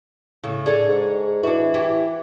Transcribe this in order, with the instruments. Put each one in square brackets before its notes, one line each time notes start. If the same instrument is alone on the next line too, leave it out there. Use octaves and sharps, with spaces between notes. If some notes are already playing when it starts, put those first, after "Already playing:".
[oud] A2 C#3
[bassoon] D4 [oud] G#4 A4 C#5
[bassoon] G#2
[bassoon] E3 [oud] D4 F#4
[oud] E4 G4